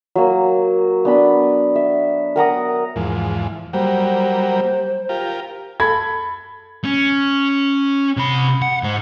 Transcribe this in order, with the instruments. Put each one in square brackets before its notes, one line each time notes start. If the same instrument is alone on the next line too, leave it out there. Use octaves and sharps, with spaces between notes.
[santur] F#3 A#3
B3 D4 B5
E5
A#4 F#5 A#5 D#6
[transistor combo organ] E2 G#2 F3
[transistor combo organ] F#3 G3 A#3 [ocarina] C5
[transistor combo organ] F4 G4 A#4
[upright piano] A4 B5 G#6
[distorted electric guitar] C#4
C3 B5
F#5
G#2 C5